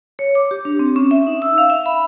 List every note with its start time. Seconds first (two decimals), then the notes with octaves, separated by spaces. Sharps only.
0.19 C#5
0.35 D6
0.51 G4
0.65 D4
0.79 C4
0.96 C#4
1.11 E5
1.27 D#4
1.42 E6
1.58 F5
1.70 E5
1.86 B5